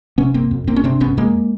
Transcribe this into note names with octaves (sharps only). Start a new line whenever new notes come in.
C3 B3 C#4
G1 A#3 C4
F2
G1 A#3 C4
C#4
C3 C4 D4
G1 B3 C#4
F2 G#3 A#3